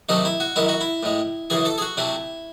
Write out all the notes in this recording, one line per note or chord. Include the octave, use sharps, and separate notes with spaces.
C3 D#3 F#3 A3 D#4
E4
F#4
F#2 D#3 G#3 E4
F#4
E4
A2 G#3
F#2 C#3 E3 G#4
A4
G#4
F#4
C3 F#3 A3 E4